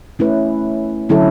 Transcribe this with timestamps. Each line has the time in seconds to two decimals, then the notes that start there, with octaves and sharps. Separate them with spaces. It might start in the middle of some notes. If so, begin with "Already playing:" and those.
0.19 A3 C#4 E4 B4
1.09 D3 F#3 C#4 E4 A4